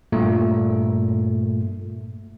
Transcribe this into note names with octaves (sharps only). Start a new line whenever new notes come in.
G2 A#2 A3